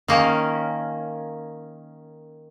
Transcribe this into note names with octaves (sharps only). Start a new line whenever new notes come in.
D#3 A#3 C#4